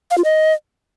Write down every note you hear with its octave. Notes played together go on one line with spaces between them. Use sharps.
F5
F4
D#5